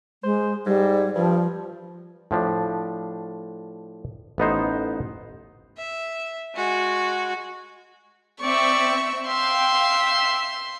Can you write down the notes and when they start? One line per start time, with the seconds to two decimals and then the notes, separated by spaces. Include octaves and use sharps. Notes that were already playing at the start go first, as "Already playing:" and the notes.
0.24 G#3 C5
0.66 G#2 G3
1.15 G2 F3
2.31 A2 F3 D4
4.38 A1 B3 D#4 C5
5.78 E5
6.55 G#3 F#4
8.41 C4 D5 E5 C#6
9.27 E5 F5 G5 C6